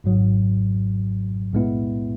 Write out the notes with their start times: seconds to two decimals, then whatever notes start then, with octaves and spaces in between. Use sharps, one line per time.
0.04 G#1 G#2 F#3
1.53 B1 A2 G#3 B3 E4